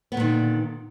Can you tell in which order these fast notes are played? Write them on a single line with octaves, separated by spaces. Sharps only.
B3 D3 A#2 D#3